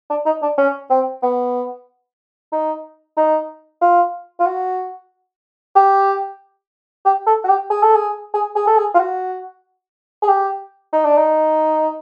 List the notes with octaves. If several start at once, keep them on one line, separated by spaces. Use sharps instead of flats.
D4
D#4
D4
C#4
C4
B3
D#4
D#4
F4
F4
F#4
G4
G4
A4
F#4
G4
G#4
A4
G#4
G#4
G#4
A4
G#4
F4
F#4
G#4
G4
D#4
D4
D#4